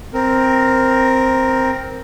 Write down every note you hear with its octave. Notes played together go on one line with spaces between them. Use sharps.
C4 A#4